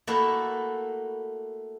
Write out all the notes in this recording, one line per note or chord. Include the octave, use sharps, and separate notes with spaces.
A3 A#3 E4 F#4